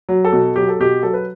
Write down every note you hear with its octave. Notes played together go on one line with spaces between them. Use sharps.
F#3
A4
B2
F#3 G4
A4
B2 G4
F#3 A4
B4